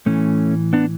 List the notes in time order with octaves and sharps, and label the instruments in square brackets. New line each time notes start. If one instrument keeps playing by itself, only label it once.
[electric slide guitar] A2 E3 A3 C#4
B3 D4